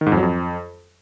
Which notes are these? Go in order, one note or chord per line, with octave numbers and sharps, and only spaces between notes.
D#3
G#2
F2
F#3
F2